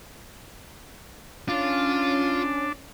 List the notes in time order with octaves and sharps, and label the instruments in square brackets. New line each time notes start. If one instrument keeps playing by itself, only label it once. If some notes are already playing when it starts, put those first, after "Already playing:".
[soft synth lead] C#4 [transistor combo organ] D4 [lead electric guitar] F4